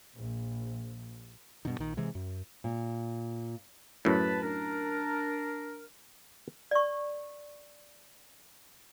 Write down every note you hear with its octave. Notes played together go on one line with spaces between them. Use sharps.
A#1
G2 B2 D#3
A#1 D#3
C3 E3 G#3
F#2
A#2
F#2 A2 B4 A5 B5
D4 A#4
D5 C#6